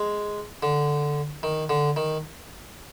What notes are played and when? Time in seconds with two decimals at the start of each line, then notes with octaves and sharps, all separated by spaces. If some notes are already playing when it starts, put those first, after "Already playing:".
Already playing: G#3
0.63 D3
1.43 D#3
1.69 D3
1.96 D#3